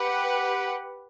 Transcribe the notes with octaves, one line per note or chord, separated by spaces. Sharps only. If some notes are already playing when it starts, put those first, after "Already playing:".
Already playing: G4 B4 F#5